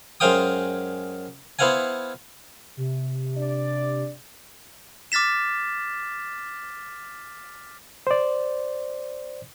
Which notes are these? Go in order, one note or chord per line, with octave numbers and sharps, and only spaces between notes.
F#2 G#3 C5 F5 G5 D#6
B3 E4 C5 F5 F#5 G#5
C3
D4 D5
D6 F6 A6 B6 E7
C5 D5